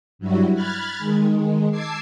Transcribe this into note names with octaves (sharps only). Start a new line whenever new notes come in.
G2 F#3 G3 E4 F#4
B5 F6 F#6 G#6 A6
D#3 G#3
A5 D6 E6 G#6 C7